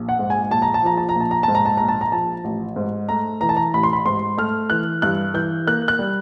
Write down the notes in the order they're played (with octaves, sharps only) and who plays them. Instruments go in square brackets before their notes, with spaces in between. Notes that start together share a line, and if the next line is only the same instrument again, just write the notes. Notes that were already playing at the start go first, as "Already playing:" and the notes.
Already playing: [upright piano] A#1
F#5
G#2
G#5
A#1 A5
A#5
A5
F3 A#5
A5
A#5
A#1 A5
A#5
G#2 A5
A#5
A5
A#1 A#5
A5
A#5
F3 A5
A1
G#2
A3 A#5
E3 A#5
A5
A#5
A1 B5
C6
B5
G#2 C6
A3 F6
E3 F#6
G2 F#6
E3 G6
A#3 F#6
F#6
G3